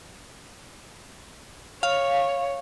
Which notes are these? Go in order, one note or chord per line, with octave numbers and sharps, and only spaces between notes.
C#5 F5